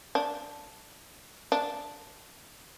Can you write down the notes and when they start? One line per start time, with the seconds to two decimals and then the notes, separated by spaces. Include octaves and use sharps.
0.15 D4
1.52 D4